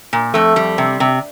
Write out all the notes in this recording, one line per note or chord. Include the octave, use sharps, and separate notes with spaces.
A#2
F2 A3
G3
C3
C3